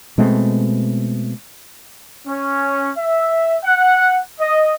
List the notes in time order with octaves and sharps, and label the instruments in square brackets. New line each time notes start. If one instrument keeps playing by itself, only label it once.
[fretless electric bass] B2 G#3 A3 C4
[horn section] C#4
E5
F#5
D#5